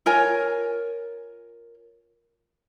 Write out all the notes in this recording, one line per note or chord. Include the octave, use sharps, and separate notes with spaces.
F4 A#4 C#5 G#5